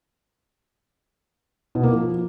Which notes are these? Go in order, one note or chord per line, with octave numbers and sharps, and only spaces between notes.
B2
A#3
F3